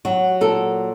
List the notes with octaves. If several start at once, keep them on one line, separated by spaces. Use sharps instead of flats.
F#3 F#4
A#2 A4